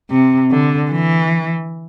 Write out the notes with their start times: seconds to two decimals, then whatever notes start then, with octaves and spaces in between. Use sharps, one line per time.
0.10 C3
0.51 D3
0.91 E3